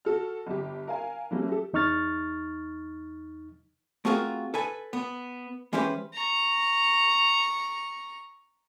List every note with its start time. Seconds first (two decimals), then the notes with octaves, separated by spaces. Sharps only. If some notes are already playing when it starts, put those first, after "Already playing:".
0.05 F#4 A4 F6
0.47 G1 G4
0.87 A#4 F5 G#5
1.31 E3 F#3 G3 A3 A#3 C#4
1.49 G4 A4
1.73 E2 D#4 C#6 F6 A6
4.05 A3 C4 F4 F#4 G#4 A#4
4.54 A4 B4 G#5
4.93 B3
5.73 E3 G#3 C#4 G4 B4 C5
6.13 A#5 C#6